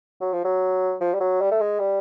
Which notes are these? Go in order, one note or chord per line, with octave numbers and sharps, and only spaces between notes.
F#3
F3
F#3
F3
G3
F#3
G3
A3
G#3
G3